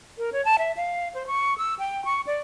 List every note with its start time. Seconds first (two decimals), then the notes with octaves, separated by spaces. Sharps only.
0.18 A#4
0.32 C#5
0.45 A5
0.59 E5
0.77 F5
1.15 C5
1.27 C#6
1.58 E6
1.79 G5
2.05 C#6
2.27 D5